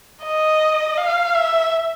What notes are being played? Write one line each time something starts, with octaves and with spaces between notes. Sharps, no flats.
D#5
F5
E5